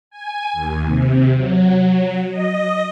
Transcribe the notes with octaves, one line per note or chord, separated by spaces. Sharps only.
G#5
D#2
C3
F#3
D#5